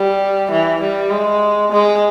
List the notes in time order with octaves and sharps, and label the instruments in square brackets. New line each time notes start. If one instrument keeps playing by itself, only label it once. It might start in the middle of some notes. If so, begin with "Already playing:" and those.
Already playing: [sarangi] G3
E3
G3
G#3
G#3